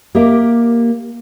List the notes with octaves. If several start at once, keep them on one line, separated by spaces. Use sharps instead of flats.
A#3 G4 A#4 D#5 E5